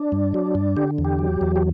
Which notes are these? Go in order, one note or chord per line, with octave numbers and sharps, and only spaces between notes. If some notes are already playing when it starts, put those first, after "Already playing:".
Already playing: D4
G2
F#3
G2
D3 G4
E2
G4
F#3
E2
G4